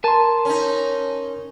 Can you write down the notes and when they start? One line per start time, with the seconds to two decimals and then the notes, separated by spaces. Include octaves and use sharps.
0.04 A#4 G#5 A5 C6
0.45 C#4 D#4